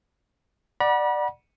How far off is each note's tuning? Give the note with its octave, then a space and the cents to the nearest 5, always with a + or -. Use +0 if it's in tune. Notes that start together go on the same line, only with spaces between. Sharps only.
D5 +20 F#5 +0 B5 -40